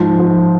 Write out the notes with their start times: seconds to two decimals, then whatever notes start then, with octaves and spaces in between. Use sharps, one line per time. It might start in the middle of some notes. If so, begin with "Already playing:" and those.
Already playing: G#2 F3
0.19 F3